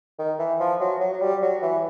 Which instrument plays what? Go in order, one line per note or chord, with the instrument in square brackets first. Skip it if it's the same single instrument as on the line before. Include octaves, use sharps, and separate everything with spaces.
[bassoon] D#3
E3
F3
F#3
F#3
F#3
G3
F#3
E3